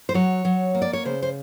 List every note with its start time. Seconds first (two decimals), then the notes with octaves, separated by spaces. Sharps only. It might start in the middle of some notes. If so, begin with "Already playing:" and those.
0.09 C5
0.14 F#3 C#5
0.45 F#3
0.75 A#3
0.82 D5
0.93 C#5
1.05 C#3 C5
1.22 C5